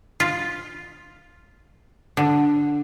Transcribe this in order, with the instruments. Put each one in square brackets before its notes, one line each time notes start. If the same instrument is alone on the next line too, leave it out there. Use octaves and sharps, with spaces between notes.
[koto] F4
D3